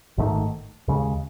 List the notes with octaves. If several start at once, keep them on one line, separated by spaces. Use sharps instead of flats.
G#1 G#2 D#3 A3
D#2 C#3 G#3